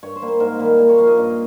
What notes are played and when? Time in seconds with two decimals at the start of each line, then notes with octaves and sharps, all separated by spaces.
0.03 G2 C#5
0.16 C5
0.22 G3 A#3
0.28 C5
0.40 G#2 A#4
0.59 D#3 G3 A#3
0.79 A#2
0.89 C#5
0.98 F3 A#3 F5
1.07 D#5
1.17 G2